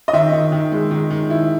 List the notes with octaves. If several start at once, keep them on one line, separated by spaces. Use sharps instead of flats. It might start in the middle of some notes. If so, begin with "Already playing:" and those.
D#5
D#3 E5
D#3
D#3
G#3
D#3
D#3
E4